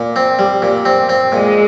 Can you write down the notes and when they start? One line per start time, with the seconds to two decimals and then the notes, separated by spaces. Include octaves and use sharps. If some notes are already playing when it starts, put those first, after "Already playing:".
Already playing: A#2
0.16 C4
0.39 G3
0.62 A#2
0.85 C4
1.09 C4
1.32 A#2 G#3